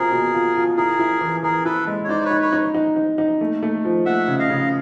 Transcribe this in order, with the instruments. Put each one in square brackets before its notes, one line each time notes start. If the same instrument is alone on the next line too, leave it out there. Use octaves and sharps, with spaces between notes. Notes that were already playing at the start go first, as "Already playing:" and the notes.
Already playing: [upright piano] B2 C4 F4 [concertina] G#4 A#4
[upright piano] B2
F4
F4
[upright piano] E4 [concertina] G#4 A#4
[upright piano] E4
E3
[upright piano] E3 [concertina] G#4 A#4
[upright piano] E4 [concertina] A4 B4
[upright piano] G#3
[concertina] C#5
[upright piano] D#4 [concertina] C5 D5
[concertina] B4 C#5
[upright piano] D#4
[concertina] B4 C#5
[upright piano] D#4
D#4
D#4
D#4
A3
A3
F3
[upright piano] A3 [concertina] E5 F#5
[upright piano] C#3
[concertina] D#5 F5
[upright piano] C#3